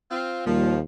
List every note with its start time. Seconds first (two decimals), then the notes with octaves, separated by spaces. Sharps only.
0.11 C4 F4
0.46 D#2 A#2 F3 G3